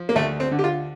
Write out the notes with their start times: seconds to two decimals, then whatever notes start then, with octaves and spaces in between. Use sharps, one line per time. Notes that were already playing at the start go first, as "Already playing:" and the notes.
Already playing: F3
0.09 A#3
0.15 D2 A3
0.40 C4
0.51 D3
0.59 G4
0.64 F4